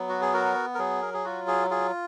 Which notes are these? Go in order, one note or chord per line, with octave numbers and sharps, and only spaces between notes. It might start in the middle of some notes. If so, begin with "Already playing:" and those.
Already playing: F#3 B3
F#4
G#4
F#4 A#4
A#4
F#3 G#4
A#4
G#4
F4 F#4
G#4
F4 G#4